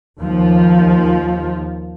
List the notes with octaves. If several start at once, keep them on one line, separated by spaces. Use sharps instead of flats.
D#2 F3